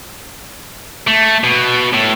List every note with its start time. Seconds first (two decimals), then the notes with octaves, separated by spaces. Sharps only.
1.07 A3
1.44 B2
1.93 A2